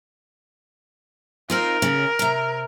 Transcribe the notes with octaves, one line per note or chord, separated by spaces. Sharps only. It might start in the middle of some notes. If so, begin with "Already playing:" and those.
C4 D#4 F4 A#4
C#3 C#4
C3 A#5